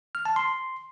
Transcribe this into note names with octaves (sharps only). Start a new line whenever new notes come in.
F6
A5
C6